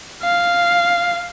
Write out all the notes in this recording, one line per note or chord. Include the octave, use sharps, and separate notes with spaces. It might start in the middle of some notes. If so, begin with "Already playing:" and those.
F5